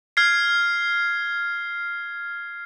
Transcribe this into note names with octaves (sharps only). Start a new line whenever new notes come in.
F6 G#6 C7